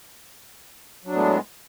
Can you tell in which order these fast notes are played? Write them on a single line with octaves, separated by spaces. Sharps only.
F#3 D4 A2 B3 G#3